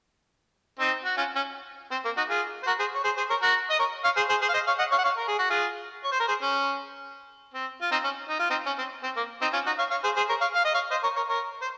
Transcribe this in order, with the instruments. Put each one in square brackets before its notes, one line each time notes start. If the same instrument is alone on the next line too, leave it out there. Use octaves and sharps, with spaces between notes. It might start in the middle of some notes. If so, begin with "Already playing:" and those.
[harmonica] C4 D#4
F#4
C#4 F4
C#4
C4
A#3
D#4 F#4
F4 G#4
C5
F#4 A#4
G#4 C5
C#5
G#4 C5
G#4 C5
A#4 C#5
F#4 A#4
D#5
A#4 C#5
C#5 F5
G#4 C5
G#4 C5
G#4 C5
F5
C5 D#5
C#5 F5
D#5 F#5
C#5 F5
F#5
C#5 F5
A#4
G#4
F#4
F4 G#4
C#5
C5
A#4
G#4 C5
C#4
C4
F4
C4 D#4
C#4
D#4
F4
C4 D#4
C#4
C4
C4
A#3
C4 D#4
C#4 F4
D#4 F#4
C#5 F5
C#5 F5
G#4 C5
G#4 C5
A#4 C#5
C#5 F5
F5
D#5
C#5 F5
C5 D#5
A#4 C#5
A#4 C#5
A#4 C#5
C5